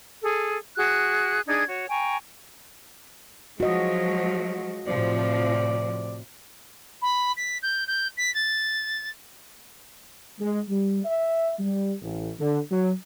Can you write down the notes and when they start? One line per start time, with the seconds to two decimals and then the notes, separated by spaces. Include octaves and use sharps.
0.21 G#4 A4
0.77 F#4 G#4 F#6
1.47 D4 D#4 G#4 G#6
1.68 F#4 C#5
1.89 G5 G#5 A#5 C#6
3.60 F3 F#3 G#3 F#4 D#5
4.88 A2 C3 F3 C4 D5
7.01 B5
7.36 B6
7.62 G6
7.87 G6
8.17 B6
8.34 A6
10.39 G#3
10.69 G3
11.05 E5
11.60 G3
12.02 A1
12.40 D3
12.71 F#3